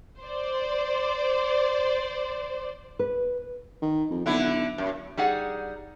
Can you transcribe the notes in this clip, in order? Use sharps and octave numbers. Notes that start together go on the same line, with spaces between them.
C5 D5
B4
D#3
F2
B1 D3 E4
F#2
G3 D#4 G#4 F#5